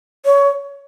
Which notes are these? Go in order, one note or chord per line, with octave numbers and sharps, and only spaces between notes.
C#5